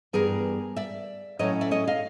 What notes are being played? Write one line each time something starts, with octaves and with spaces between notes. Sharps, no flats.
G2 E3 G3 B3 D4 G#4 A#4
D5 E5
A2 F#3 A3 C#4 E4 C#5 D#5
D5 E5
C#5 D#5
D#5 F5